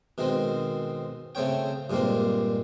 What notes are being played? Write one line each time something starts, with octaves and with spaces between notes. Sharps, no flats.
B2 D#3 G#3 C4
C#3 A3 C4 C#5 G5
G2 A#2 G#3 A#3 C4